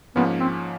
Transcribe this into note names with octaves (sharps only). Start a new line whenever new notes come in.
G#2 F3 A#3 B3 C#4
C4